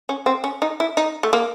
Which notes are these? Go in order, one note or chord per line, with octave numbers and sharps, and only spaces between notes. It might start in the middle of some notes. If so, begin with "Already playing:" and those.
C#4
C4
C#4
D#4
E4
D#4
A3
A#3